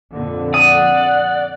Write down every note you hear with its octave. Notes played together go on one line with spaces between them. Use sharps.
F2 A#2 D3
D5 F#5 D#6